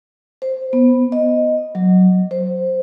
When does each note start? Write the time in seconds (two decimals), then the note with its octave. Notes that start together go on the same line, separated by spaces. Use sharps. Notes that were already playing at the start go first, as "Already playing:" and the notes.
0.42 C5
0.73 B3
1.12 D#5
1.75 F#3
2.31 C5